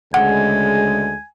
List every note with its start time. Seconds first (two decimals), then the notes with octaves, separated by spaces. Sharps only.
0.14 D2 C#3 G#3 F#5 G#5